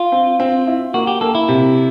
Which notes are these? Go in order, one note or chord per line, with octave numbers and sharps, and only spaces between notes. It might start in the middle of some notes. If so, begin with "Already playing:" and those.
Already playing: F4
C4
C4
E4
A#3 F#4
G4
A#3 A4
E4
C3